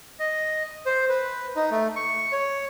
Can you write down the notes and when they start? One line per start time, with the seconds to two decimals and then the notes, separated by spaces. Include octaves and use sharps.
0.19 D#5
0.86 C5
1.09 B4
1.56 D#4
1.71 A3
1.96 C#6
2.32 C#5